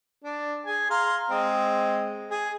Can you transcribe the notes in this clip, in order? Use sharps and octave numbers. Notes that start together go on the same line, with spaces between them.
D4
G#4 G#5
F5 A#5 C6
G#3 C4 D#5
G#4